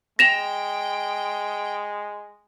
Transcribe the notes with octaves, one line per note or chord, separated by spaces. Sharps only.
G#3 G5 A#6 E7 F7